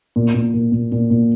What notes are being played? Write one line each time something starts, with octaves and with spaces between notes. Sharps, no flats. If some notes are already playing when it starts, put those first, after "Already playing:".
A#2
A#2
A#2
A#2
A#2
A#2